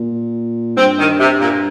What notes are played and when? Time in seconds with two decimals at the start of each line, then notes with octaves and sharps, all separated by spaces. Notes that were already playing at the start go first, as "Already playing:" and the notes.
Already playing: A#2
0.77 G2 C4
0.99 D#3
1.19 C3
1.41 A#2